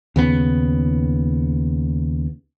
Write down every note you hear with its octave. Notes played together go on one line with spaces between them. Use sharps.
D#2 C#3 B3